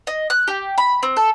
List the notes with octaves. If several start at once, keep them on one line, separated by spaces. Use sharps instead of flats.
D#5
F#6
G4
B5
C4
A4